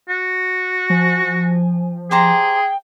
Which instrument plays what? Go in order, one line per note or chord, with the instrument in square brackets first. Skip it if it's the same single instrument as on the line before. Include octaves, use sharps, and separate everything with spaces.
[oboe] F#4
[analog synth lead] F3 [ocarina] G#5
[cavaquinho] G4 C5 A#5 [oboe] G#4 [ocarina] G5